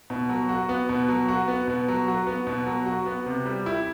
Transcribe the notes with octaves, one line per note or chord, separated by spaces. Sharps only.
B2
F#3
F#4
B3
B2
F#3
F#4
B3
B2
F#3
F#4
B3
B2
F#3
F#4
B3
C3
G3
E4